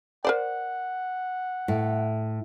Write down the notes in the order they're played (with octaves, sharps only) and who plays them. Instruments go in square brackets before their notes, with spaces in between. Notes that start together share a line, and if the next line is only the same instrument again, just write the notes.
[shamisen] A#4 C5 D5 [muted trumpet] F#5
[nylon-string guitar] A2